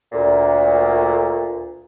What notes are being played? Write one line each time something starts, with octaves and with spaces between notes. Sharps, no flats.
D2 A#2